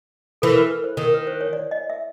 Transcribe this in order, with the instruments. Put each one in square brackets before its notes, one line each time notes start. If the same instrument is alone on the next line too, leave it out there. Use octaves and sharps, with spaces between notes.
[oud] E3 [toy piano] A4
[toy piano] A#4
B4
B4
C5
[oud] D#3
[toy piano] A#4
B4
C5
C#5
D5
D#5
E5